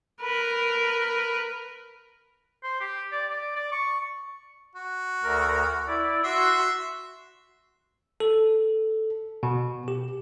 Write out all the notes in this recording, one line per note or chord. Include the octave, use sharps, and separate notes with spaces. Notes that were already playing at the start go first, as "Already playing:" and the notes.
A#4 B4
C5
G4
D5
D5
D5
C#6
F#4
D2 A#4
E4 D5
F#4 E5 C6
A4
B2
G4